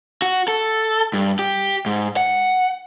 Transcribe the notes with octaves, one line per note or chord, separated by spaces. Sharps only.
F#4
A4
G2
G4
G#2
F#5